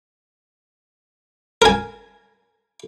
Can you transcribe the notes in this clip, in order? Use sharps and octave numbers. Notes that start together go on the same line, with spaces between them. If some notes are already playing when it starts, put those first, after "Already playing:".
A#4 G#5